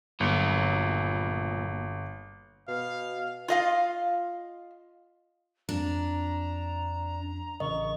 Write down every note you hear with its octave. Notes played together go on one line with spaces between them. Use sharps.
G1 A#2 F#3
B2 F5
F4 D#5 F5
F2 F3 D4 A#5
A1 C#3 A#4 D#5 C#6